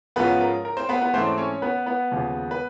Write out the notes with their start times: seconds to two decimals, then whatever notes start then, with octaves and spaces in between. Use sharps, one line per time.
0.16 G#2 F3 G#3 B3 C#4 F4 B4
0.41 A#4
0.65 A#4
0.77 C4 C5
0.89 B3 B4
1.01 B3 B4
1.14 G#2 E3 A3 C4 C#4 C5
1.27 D5
1.38 C#4 C#5
1.62 B3 B4
1.86 B3 B4
2.11 D#2 C#3 F3 G#3
2.51 B4